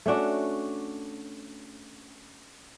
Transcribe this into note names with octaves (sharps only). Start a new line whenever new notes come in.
A3 C#4 D4 F#4